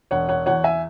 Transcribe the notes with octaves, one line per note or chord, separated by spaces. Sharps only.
E1 C#5 F#5
C#5 F#5
E2 E3 C#5 F#5
E5 G#5